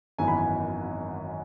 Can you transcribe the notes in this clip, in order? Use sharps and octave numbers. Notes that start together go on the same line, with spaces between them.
G#1 F#2 E3 B3 G#5
B5
G#5